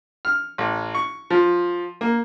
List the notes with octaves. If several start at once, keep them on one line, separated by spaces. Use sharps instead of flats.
F6
A1
C#6
F3
A#3